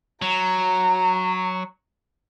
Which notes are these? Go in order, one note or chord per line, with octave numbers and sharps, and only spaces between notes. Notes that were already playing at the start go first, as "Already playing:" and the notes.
F#3 A#5